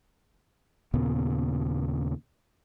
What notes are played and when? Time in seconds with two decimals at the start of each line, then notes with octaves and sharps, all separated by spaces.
0.94 D#2 A#2 C#3 B3